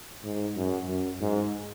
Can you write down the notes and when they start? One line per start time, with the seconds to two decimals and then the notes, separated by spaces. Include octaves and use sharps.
0.24 G#2
0.56 F#2
0.88 F#2
1.21 G#2